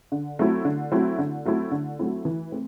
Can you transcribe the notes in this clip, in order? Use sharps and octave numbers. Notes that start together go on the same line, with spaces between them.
D3
F#3 A3 C4 E4
D3
F#3 A3 C4 E4
D3
F#3 A3 C4 E4
D3
F#3 A3 C4 E4
E3
A3 C4